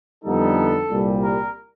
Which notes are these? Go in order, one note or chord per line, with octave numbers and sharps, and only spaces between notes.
F2 D3 G3 B3 D#4 A4
C2 A#2 G3
A#4